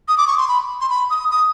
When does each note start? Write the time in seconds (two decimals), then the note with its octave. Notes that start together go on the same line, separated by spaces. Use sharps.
0.08 D#6
0.18 D6
0.27 C#6
0.38 C6
0.48 B5
0.81 C6
0.90 B5
1.10 D#6
1.31 D#6